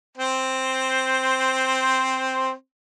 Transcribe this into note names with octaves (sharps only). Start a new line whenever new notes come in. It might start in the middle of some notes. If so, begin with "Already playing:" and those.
C4 C5